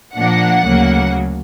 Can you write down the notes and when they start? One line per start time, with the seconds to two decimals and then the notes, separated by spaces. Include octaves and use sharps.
0.15 A#2 F3 A#3 D4 F#5
0.65 D2 C#3 F#3 A#3